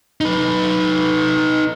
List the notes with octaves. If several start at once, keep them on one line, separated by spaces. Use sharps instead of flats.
D#4 B4